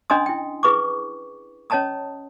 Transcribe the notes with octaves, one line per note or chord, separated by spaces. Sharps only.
C#4 D4 D#5 G#5 C6 D#6
E4 G5
E4 G#4 B4 C#6 D6
C#4 C#5 D#5 A5 A#5 D#6